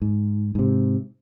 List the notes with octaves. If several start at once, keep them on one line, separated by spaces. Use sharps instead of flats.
G#2
G#2 C3